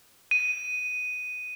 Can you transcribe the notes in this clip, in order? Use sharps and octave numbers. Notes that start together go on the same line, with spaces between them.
D#7